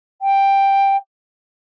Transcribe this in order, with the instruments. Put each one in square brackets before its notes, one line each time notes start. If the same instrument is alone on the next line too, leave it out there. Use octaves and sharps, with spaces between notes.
[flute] G5